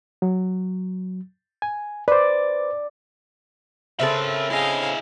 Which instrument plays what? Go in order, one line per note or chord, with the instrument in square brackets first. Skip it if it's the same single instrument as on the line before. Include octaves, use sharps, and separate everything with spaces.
[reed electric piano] F#3
G#5
[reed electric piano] B4 C5 [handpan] D5
[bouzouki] C#3 C4 A4 [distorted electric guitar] A#4 B5 [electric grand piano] E5
[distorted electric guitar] E4 D#5 [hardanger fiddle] G#4 F5